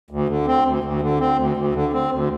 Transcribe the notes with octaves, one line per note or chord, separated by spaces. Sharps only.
D2
D3
C4
D2
D2
D3
C4
D2
D2
D3
C4
D2